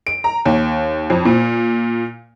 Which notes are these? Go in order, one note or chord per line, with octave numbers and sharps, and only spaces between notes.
D7
A#5
D#2
F2
A#2